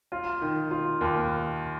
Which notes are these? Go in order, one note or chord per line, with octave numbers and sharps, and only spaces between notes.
F4
D#3
F4
D#2